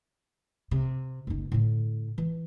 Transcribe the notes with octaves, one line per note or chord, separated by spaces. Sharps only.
C3
F#1 D#4
A2 D3
E3